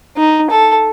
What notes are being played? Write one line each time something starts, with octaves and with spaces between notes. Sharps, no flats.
D#4
A4